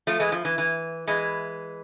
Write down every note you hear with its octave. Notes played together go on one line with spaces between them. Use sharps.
F3 A3
E3 G#3
F3
E3
E3
E3 G#3